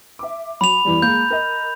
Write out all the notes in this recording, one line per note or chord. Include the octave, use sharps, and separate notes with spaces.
E5 D6
F#3 B5 F7
E2 E3 G3
G#3 A#3 G6
A#4 D#5